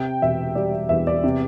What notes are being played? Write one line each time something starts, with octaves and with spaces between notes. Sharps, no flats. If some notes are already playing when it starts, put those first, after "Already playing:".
Already playing: C3 G5
E1 E5
G3 D5
E2 E5
D5
C3